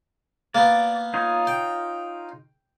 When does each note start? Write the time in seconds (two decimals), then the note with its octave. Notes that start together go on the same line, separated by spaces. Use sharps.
0.55 A#3 B3 D5
1.14 D#4 F4 C#5
1.47 G5